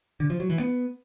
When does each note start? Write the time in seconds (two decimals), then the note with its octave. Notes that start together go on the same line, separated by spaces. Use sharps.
0.20 D3
0.30 F3
0.40 F#3
0.50 E3
0.60 B3